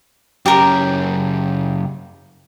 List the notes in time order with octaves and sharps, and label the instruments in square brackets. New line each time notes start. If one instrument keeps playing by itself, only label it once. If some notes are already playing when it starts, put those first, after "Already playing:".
[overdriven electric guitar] F#2 C#3 [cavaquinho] G4 A#4